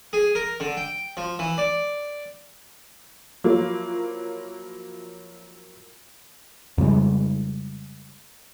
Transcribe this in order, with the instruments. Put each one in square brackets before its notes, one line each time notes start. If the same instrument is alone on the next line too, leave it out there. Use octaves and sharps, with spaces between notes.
[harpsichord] G#4
A#4
D3
G5
F3
E3
D5
[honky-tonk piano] F3 F#3 A#3 E4 F4 A#4
[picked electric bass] F2 C#3 G3 G#3